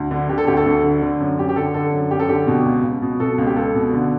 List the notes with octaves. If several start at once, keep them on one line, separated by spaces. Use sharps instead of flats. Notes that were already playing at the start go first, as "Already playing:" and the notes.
Already playing: D2
D3
D3 G4
A4
D2 G4
A4
D2
D3
D3
F#2
F#2 G4
G4
D3 A4
D3 A4
F#2
F#2 G4
A4
D3 G4
B2
C#2
C#2
B2
B2 A4
C#2
G4
C#2 A4
B2
D3